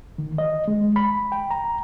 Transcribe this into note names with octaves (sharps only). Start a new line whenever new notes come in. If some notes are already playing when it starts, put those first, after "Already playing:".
D#3
D#5
G#3
B5
G5
A#5